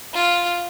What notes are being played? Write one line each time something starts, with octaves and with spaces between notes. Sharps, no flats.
F4